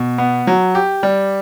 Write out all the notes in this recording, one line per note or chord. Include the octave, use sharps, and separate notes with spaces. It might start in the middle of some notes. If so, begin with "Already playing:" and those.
Already playing: B2
B3
F#3
G4
G3